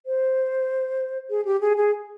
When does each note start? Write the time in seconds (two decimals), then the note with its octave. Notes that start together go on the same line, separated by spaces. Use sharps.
0.06 C5
1.30 G#4
1.45 G4
1.61 G#4
1.77 G#4